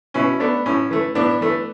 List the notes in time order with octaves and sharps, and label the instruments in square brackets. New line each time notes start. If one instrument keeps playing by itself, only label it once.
[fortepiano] B2 C#4 E4
A3 B3 D4
A2 C#4
E3 A3
A2 B3 D4
E3 A3